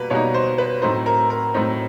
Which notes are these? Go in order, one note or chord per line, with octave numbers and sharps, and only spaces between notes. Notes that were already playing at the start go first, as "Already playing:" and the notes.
Already playing: B2 G3 A#3 B4
B2 G3 A#3 D#4 C#5
C5
B4
A2 F#3 A3 C4 D#4 C5
A#4
A#4
A2 F#3 A3 C4 D#4